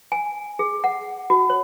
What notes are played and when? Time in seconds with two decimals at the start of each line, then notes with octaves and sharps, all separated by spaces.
0.12 G#5
0.59 G#4
0.84 F#5
1.30 F#4
1.50 C#5